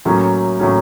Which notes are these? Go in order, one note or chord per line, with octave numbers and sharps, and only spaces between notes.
A2 F#3 A#3 C#4
A2 F#3 A#3 C#4